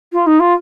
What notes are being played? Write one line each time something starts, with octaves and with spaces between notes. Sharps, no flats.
F4
D#4
F4